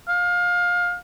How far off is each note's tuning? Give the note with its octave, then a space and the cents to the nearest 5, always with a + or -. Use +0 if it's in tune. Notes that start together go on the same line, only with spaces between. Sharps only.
F5 +25